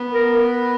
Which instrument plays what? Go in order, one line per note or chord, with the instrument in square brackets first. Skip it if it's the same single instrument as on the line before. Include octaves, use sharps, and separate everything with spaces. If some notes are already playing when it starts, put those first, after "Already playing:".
Already playing: [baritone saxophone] B3
[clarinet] A#4